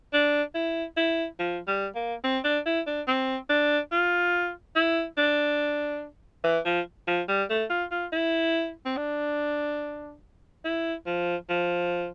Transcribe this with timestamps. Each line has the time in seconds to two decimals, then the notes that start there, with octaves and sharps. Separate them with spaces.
0.13 D4
0.55 E4
0.97 E4
1.39 F3
1.67 G3
1.95 A#3
2.24 C4
2.44 D4
2.66 E4
2.87 D4
3.08 C4
3.49 D4
3.92 F4
4.76 E4
5.18 D4
6.44 E3
6.65 F3
7.07 F3
7.28 G3
7.50 A3
7.70 F4
7.91 F4
8.12 E4
8.86 C4
8.97 D4
10.65 E4
11.07 F3
11.49 F3